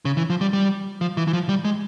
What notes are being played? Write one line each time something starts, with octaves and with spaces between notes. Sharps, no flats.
C#3
E3
F3
G3
G3
F3
E3
E3
F3
G3
G#3